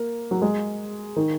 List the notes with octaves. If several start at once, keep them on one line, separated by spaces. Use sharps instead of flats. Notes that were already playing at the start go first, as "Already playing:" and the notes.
Already playing: A#3
F#3
G#3
D#3